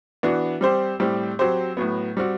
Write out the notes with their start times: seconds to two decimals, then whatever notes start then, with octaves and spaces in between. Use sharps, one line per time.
0.23 E3 B3 D4 F#4
0.61 G3 C4 G4 C5
1.00 A2 G3 C4 G4
1.39 F#3 C4 G4 C5
1.77 A2 F#3 B3
2.17 G3 C4 F#4